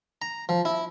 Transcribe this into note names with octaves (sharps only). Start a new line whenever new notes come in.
A#5
F3
E4